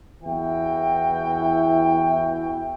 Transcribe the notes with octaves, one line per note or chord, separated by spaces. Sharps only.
E2 E3 E4 F#4 G5